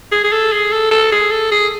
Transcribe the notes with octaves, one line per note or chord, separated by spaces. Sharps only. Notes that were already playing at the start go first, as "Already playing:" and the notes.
G#4
G#4
A4
G#4
A4
A4
G#4
A4
G#4